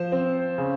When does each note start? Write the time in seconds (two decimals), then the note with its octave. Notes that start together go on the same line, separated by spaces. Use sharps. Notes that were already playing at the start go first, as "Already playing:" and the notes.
Already playing: F3 C5
0.12 C4
0.58 C#3